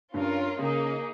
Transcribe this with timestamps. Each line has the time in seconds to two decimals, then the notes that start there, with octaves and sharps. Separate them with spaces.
0.14 G2 C#4 F4 A#4
0.59 C#3 A#3 D#4 G#4